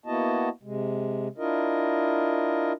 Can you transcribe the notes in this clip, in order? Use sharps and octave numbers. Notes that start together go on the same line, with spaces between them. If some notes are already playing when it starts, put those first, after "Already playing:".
A#3 B3 E4 F#4 D#5 A5
C3 G#3
D4 E4 F4 A#4 D#5